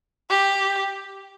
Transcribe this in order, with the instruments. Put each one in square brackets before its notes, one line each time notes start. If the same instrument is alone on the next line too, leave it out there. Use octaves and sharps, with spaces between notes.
[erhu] G4